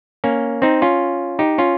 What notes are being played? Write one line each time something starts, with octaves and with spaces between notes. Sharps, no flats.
A#3 C#4
C4 D#4
C#4 F4
D#4 G4
C#4 F4